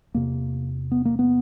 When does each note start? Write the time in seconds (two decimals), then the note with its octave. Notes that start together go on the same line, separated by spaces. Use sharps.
0.15 E2 C3 A#3
0.91 B3
1.05 A#3
1.19 B3